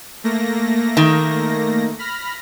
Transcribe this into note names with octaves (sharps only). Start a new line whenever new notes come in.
A3 A#3 A#6
D#3
B5 F6 A#6